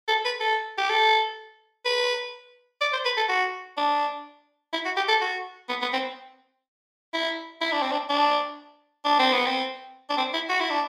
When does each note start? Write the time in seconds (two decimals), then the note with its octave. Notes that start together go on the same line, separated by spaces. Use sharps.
0.08 A4
0.25 B4
0.40 A4
0.78 G4
0.89 A4
1.85 B4
2.81 D5
2.93 C5
3.05 B4
3.17 A4
3.29 F#4
3.77 D4
4.73 E4
4.85 F#4
4.96 G4
5.09 A4
5.21 F#4
5.69 B3
5.82 B3
5.93 C4
7.14 E4
7.61 E4
7.72 D4
7.82 C4
7.92 D4
8.09 D4
9.05 D4
9.19 C4
9.33 B3
9.46 C4
10.10 D4
10.18 C4
10.34 E4
10.49 F#4
10.60 E4
10.70 D4